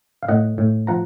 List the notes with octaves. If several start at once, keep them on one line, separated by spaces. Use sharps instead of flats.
F5
A2 D#5 F#5
A2
F3 F#5 A#5